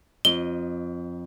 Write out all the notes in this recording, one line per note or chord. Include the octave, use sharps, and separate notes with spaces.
F2 D#5 G7